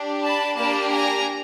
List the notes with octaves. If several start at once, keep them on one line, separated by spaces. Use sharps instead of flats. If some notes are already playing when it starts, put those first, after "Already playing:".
Already playing: D4 G4
A5 B5
A#3 D4 G4 A5 B5
G#5 A#5